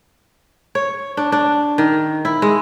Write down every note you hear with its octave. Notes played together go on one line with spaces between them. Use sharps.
C#5
D4
D4
D#3
E4
G#3